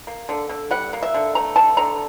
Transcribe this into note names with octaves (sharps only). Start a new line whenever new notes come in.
A#3
D3
D3
G3 F#5
A#3
E5
D3
A3 A#5
D3 A5
D3 A#5